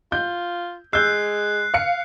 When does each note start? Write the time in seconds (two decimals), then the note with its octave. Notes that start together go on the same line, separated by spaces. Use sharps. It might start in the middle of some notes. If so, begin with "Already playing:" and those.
0.12 F4 G6
0.93 G#3 E6 F#6 G6 C7
1.74 F5 C#7